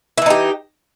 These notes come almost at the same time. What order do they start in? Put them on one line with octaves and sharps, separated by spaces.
E4 E3 D#4 G4